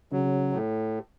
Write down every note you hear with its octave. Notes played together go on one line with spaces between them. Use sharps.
C#3 F#3
A2